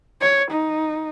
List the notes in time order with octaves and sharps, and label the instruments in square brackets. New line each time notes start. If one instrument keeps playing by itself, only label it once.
[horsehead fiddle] C#5
D#4